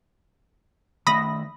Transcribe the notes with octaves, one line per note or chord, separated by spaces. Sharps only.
D#3 A3 E5 B5 D#6 A#6